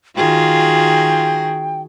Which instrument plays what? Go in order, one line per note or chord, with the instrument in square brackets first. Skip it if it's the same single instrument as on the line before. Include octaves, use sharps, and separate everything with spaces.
[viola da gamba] D#3 F#4 G#4 [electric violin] F4 [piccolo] G5